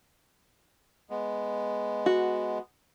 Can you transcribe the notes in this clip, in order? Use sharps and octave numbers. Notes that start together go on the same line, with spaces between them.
G#3 B3
F#4